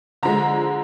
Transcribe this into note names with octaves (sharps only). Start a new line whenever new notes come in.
D3 F3 G#3 A#5